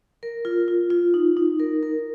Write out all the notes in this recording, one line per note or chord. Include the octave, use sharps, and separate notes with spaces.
A#4
F4
F4
F4
D#4
D#4
A#4
A#4